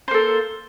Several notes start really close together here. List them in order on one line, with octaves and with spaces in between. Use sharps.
C5 A#3 A4